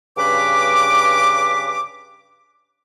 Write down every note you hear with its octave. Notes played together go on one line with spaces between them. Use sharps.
G2 C#3 B4 D6